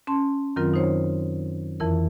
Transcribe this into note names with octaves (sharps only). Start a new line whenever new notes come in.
C#4 A5 C6
F#2 D#3 F#3 C4 F4 A#4
D#4 F4 C5 C#5
F2 E3 E4 A#4